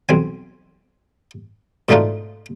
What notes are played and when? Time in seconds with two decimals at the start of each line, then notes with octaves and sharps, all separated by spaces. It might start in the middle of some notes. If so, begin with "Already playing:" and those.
0.09 B1 C4 G#5
1.89 G#2 B2 A3 D4 D#4 F4